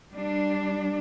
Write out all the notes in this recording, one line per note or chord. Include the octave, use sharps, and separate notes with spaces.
G3 D4